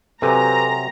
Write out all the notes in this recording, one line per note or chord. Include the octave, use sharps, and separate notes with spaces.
C3 F#3 A4 B4 G#5 A#5